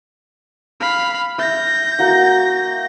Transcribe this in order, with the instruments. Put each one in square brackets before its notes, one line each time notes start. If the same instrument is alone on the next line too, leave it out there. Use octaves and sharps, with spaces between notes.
[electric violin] F5 B5
[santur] E5 [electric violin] G6 A#6
[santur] A#3 F#4 C#6